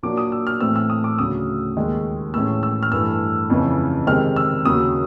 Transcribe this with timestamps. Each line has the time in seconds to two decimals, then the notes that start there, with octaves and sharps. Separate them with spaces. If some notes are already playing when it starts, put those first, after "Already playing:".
0.03 A#2 F#3 A#3 D4 D6
0.17 D#6
0.32 E6
0.47 F6
0.61 A2 E3 A3 C4 E6
0.76 E6
0.90 D#6
1.04 D6
1.19 D2 C#3 F#3 D#6
1.77 D#2 D#3 G#3
2.34 A2 E3 G#3 C#4 E6
2.63 E6
2.83 F6
2.92 G2 E3 A3 E6
3.50 F2 C#3 E3
4.07 C3 D#3 G#3 C4 F6
4.36 E6
4.65 D#2 C#3 F#3 D#6